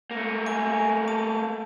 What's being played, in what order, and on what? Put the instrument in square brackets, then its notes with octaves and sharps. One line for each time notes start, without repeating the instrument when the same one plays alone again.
[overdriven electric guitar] A3 A#3
[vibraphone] G#5
A5